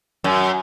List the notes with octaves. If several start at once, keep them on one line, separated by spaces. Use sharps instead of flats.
F#2